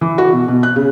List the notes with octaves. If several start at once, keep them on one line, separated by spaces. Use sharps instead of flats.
E3
F#4
B2
B2
F#6
C#3